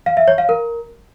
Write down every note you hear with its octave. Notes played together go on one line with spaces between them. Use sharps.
F5
E5
C#5
F5
A#4